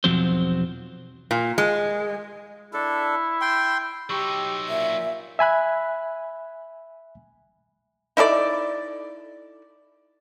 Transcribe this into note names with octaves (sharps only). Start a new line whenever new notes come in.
B1 E2 F3 F#3 C4 C5
A#2
G#3
D4 E4 A4
G5 C6
F#3 D#4 G4 C6 C#6 E6
A#2 E5
E5 G#5 B5 F#6
D#4 E4 A4 D5